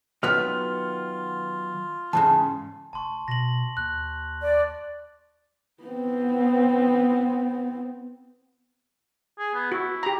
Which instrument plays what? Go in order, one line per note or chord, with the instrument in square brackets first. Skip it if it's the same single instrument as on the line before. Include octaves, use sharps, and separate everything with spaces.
[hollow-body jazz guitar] D#3 F#3 B3 [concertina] F4 [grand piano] F6
[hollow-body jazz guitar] E2 G#2 C#3 [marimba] A5
[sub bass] F1 [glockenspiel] A5 C6 C#6
[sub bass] B2 [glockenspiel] A#6 F#7
[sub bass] D#2 [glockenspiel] F#6
[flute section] D5
[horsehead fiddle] B3 C4
[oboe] G#4
B3
[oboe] E4 [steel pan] F#4
[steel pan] G4 A#5